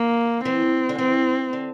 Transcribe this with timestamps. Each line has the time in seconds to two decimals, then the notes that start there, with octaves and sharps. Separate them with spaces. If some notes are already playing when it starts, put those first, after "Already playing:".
Already playing: A#3
0.44 E3 C4
0.89 D3
0.98 E3 C4
1.53 D3